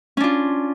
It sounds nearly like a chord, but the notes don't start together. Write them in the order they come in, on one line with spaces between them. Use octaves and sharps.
C#4 D4 F4